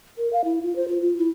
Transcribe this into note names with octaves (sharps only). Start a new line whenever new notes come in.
A#4
F5
E4
F4
C5
F4
F4
E4